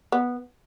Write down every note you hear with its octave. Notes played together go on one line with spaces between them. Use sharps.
B3